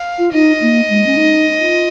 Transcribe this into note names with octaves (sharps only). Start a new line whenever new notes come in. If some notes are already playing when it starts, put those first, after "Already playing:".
Already playing: F5
F4
D#4 D#5
A#3
G#3
C#4
D#4
F4